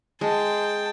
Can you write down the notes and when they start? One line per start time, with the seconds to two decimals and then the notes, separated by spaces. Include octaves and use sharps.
0.21 G#3 G5 A5